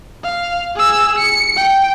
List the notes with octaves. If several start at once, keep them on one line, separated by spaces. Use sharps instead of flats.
F5
G#4 E6
C#7
G5